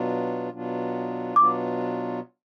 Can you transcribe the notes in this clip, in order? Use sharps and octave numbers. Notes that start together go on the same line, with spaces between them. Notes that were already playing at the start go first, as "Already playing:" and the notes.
Already playing: B2 F#3 B3 D4 F4
B2 F#3 B3 D4 F4
B2 F#3 B3 D4 F4 D6